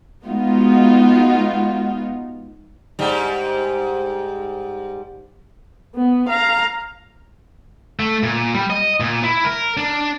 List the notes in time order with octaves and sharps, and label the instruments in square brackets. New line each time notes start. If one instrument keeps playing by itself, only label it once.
[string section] G#3 B3 D#4 F4 F#4
[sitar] G#2 G3
[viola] B3
F5 A#5
[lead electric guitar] A3
A#2
G3
D#5
A#2
E4
A#4
D4